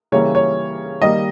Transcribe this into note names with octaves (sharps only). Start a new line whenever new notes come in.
C#3 E3 G3 A#3 C#5
C#5
D#3 G3 A#3 D#5